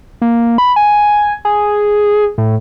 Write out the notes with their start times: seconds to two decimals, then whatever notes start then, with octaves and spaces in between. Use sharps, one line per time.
0.22 A#3
0.58 B5
0.76 G#5
1.45 G#4
2.38 A2